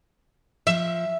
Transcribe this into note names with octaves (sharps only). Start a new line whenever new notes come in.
F3 E5